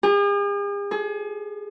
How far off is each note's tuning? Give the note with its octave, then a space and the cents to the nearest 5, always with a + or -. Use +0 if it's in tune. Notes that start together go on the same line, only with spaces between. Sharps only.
G#4 -45
G#4 +35